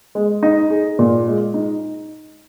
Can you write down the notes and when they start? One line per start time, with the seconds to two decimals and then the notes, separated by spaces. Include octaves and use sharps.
0.15 G#3
0.43 D#4
0.70 G#4
0.99 A#2
1.27 G#3
1.54 D#4